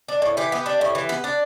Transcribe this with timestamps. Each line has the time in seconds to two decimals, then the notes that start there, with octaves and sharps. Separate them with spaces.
0.08 D4
0.22 A2
0.37 E3 G4
0.52 B3
0.66 D4
0.81 A2
0.95 E3
1.09 B3
1.24 D4